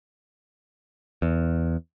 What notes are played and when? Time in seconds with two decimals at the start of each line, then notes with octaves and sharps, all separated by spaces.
1.22 E2